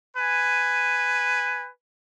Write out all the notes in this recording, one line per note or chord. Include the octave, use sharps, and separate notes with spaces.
B4 G#5